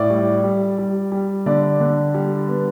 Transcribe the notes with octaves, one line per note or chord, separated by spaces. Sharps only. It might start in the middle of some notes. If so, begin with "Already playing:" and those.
Already playing: A2 D5
G3
G3
G3
G3
D3 D5
D3
G3
B3